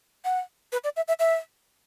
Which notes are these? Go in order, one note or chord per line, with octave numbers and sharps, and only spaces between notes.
F#5
B4
D5
E5
E5
E5